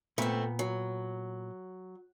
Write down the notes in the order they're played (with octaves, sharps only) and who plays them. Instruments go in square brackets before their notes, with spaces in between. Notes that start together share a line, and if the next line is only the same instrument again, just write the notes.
[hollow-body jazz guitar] A#2 B3 [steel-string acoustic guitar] A3 C4
[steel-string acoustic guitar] F#3